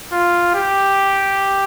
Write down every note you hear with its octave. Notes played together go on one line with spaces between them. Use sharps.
F4
G4